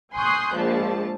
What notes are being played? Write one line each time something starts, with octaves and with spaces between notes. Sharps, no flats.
G#5 C6 C#6 D#6 F#6 G6
A#1 F3 G#3 A5